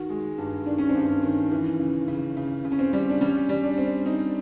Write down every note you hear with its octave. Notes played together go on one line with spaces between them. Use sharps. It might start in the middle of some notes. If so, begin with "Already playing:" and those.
Already playing: D#3 F#4
G#3
G2
D#3 D4
C#4
C4
G2
C#4
D#3
E3
C#3
C#3
C#3
C#3
C#4
C4
G3
D4
G3 C#4
G3
D4
C4
C4 D#4